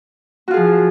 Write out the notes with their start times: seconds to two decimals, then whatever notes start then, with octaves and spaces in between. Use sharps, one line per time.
0.48 F#4
0.51 F4
0.54 G#4
0.57 F3